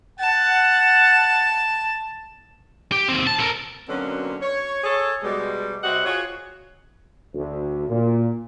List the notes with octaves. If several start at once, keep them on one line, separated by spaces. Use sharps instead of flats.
F#5 A5
G4
D#2 C4
A5
A4 A#4
B2 D3 F#3 A#3 C4 C#4
C#5
G#4 A4 C#5
B2 G3 G#3
C3 G3 C4 F#4 D#5 F#5
F4 F#4 G#4 C#5
D2
A#2